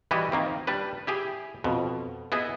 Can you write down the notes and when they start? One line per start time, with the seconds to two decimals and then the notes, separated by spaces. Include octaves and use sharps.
0.11 E3 G3 E4 F#4 G4 D#5
0.32 D#3 A#3 C4
0.67 G3 D4 B4
1.07 E4 G4 G#4
1.64 F2 B2
2.32 B3 E4 G#4 D#5